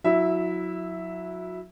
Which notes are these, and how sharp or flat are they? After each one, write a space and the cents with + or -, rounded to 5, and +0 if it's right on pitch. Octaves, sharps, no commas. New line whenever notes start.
F#3 -25 E4 -15 E5 +0